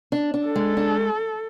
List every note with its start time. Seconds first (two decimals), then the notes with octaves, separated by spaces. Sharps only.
0.12 D4
0.34 D4
0.45 A4
0.56 G#3
0.77 D4